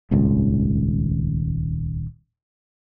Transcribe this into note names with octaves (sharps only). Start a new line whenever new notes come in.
D#1 G#1 C#2